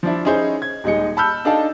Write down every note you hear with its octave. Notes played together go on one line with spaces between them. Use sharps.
F3 D4 E4
C#4 D#4 E4 G#4 C5 C#5
G#6
D#1 G#3 D#4 C#7
A5 B5 E6 F6 G6
D4 D#4 A4 D5 F5 A5